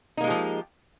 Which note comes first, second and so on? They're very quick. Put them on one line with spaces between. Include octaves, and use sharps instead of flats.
D#4 A#3 G#3 G4 F3